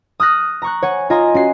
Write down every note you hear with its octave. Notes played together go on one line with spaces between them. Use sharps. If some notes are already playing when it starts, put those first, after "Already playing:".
D#6 F6 F#6 A#6
A#5 C#6 F#6
C#5 F#5 G#5
F4 D#5 G#5 A#5 C6
C#4 F#4 C7